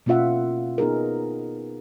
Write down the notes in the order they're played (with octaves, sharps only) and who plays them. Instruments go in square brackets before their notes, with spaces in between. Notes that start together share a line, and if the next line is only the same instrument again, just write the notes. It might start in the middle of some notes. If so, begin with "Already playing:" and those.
[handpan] B2 A#3 C#4 F4 E5 F#5
B3 D#4 G#4 A#4